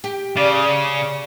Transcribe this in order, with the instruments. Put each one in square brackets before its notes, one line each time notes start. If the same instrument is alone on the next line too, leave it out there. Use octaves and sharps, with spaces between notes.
[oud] G4
[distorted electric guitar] C#3 [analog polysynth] D5